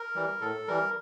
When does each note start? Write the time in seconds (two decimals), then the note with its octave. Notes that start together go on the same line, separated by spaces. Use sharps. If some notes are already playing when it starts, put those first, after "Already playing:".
Already playing: A#4
0.15 E3 G3
0.41 A2 A4
0.68 E3 G3 A#4